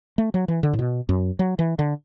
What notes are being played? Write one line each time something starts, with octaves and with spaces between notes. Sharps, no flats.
A3
F#3
E3
D3
A2
B2
F#2
F#3
E3
D3